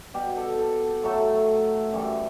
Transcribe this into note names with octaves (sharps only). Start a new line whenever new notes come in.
B2 G3 G4
A4
A4
A2 F#3 A3 A4
F#2 E3 G3